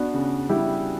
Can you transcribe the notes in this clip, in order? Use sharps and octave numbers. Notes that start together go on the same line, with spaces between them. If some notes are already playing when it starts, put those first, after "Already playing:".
Already playing: B3 D4 F#4
C#3
G3 E4 G4